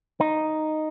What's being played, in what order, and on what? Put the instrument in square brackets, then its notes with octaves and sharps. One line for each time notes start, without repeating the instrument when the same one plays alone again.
[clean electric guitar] D#4